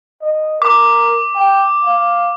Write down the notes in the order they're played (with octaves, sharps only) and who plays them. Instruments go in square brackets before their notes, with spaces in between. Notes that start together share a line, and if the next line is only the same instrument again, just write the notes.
[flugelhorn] D#5
[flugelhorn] A#4 [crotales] D6
[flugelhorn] G5
F5